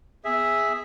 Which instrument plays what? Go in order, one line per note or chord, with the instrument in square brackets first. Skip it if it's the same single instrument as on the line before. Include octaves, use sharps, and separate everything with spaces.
[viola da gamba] B3 [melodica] G#4 E5